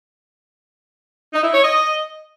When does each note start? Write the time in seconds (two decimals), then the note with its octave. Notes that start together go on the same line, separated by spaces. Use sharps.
1.33 D#4
1.44 E4
1.54 C#5
1.64 D#5